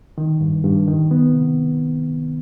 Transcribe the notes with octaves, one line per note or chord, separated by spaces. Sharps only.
D#3
G2
G2
D#3
B3
C3